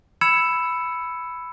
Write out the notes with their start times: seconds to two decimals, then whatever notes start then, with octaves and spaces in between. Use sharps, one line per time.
0.21 B5 E6 G#6 C#7 E7